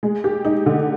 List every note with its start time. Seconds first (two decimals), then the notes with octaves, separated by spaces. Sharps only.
0.03 G#3
0.24 G4
0.45 D#4
0.66 D3